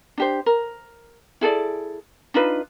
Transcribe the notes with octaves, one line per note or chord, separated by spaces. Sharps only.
D4 G4 C5
A#4
E4 G#4 A4 D5
D4 D#4 F4 B4